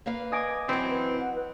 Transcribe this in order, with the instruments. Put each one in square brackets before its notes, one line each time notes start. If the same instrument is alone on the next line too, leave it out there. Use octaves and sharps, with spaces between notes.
[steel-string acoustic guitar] A#3 B4 F5
[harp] D#5 G#5 D6
[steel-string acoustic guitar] F#2 E3 [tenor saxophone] C4
[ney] B4
F#5
B4